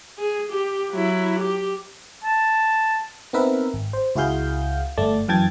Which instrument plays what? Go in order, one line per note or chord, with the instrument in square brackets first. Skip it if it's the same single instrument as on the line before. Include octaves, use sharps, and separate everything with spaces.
[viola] G#4
G4
F#3 E4
G4
[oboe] A5
[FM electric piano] B3 C4 D#4 A#4 B4 E5
G#1
C5
C#2 E4 F#4 G#4 F5 G6
G1 A3 D5 A5
F#2 E3 G5 A5 G#6 A6